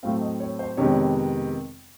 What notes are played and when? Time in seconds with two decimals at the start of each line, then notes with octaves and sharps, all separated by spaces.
0.03 A2 F#3 A3 C4 F5
0.21 D#5
0.40 C#5
0.59 C5
0.77 F2 C3 D#3 G#3 B3 C#5